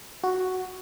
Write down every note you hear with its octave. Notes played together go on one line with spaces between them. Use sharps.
F#4